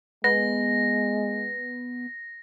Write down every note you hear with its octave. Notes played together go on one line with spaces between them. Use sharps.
G#3 B3 A#6